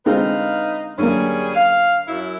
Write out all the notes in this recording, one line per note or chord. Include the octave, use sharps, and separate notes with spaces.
D3 G#3 C4 D#4 B4 F5
F#2 D3 G3 A#3 C#4 G#4
F5
F#2 E4